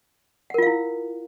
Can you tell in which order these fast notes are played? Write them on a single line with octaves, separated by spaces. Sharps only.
F#5 A#4 F4 F5 E4